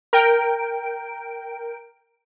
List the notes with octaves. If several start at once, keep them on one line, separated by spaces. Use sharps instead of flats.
A#4 G5 D7